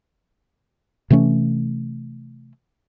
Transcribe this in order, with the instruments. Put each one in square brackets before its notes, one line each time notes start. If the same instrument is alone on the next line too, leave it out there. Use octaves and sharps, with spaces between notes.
[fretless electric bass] C3 E3 A3 C#4